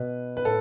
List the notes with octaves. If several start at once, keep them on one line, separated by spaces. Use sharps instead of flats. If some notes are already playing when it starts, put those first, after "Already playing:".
Already playing: B2 B4
B4
A2 A4